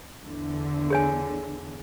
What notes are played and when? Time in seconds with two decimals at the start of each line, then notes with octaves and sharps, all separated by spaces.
0.24 E2 D3
0.90 G#4 C#5 G#5